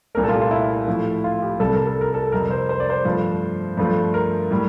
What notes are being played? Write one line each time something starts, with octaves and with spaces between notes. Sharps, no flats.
C2 A#2 A3 A#4
A4
F4
G4
F4
E4
A2 F3 A3
F4
G4
C2 C3 G3 A4
A#4
A4
A#4
A4
F2 C3 G3 A#4
C5
C5
D5
C5
G2 F3 A3
G2 F3 A3
A#4
A2 G3